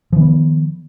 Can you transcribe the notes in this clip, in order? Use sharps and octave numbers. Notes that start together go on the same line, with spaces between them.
D#3 F3 B3